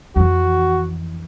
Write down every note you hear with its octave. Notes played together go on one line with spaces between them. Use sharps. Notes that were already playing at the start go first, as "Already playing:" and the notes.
F2 E3 F#4